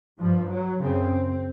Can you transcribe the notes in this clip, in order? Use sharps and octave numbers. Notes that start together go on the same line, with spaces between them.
G2 F3
F#3
F#2 C#3 C4